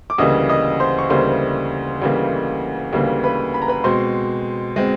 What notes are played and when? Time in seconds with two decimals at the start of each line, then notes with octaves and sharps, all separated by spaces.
0.10 D6
0.18 D2 C#3 E3 G3 A#3 D#5 D#6
0.49 D#5 D#6
0.80 C5 C6
0.99 C#6
1.10 D2 C#3 E3 G3 A#3 C5 C6
2.02 D2 C#3 E3 G3 A#3
2.93 D2 C#3 E3 G3 A#3
3.24 B4 B5
3.54 B5
3.62 A#5
3.68 B4 B5
3.84 B2 G#3 C4 C5 C6
4.76 B2 G#3 C4